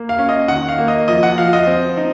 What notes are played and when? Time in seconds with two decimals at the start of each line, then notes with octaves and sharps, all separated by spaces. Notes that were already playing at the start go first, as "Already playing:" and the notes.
Already playing: A#3
0.09 F5
0.19 C#4
0.29 D#5
0.48 D#3 F#5
0.68 F5
0.78 A#3
0.88 D#5
1.08 F3 D#5
1.23 F#5
1.38 F3 F5
1.53 D#5
1.67 C4
1.97 D#4